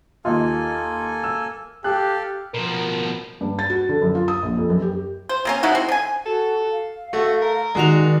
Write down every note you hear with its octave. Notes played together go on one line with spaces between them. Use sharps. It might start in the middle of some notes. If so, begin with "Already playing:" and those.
D#2 A#3 D#4 F4 A4 G#5
E6
G4 A4 F5 A5 F#6
B2 F3 A#4
G2
A6
F#4
D3
F#2
F4
D#6
A#1
F2
F#2
G4
C5
C3 A#3 C#4
G#3 D#4 E4 F#4
C4
D3 G#5
F#4 A4
F5
A3 F#4
A#4
D#3 G#3 F#4 D5 F7